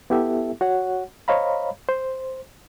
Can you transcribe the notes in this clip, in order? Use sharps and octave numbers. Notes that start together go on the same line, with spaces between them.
B3 E4 G4 A4 E5
F#4 C#5 F#5
C5 C#5 D#5 F5 A#5 B5
C5